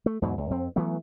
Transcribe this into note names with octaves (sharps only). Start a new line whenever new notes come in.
A3
E2 G#2 B2 F#3
C#2
F2 C4
E3 F#3 A3 B3